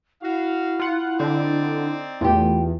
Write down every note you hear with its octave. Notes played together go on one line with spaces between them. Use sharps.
E4 F#4 F5
F4 F#5
D3 C4 D#4 D5
E2 A3 F4 G4